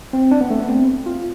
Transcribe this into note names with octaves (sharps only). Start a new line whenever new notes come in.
C4
D4
B3
A3
B3
C4
F4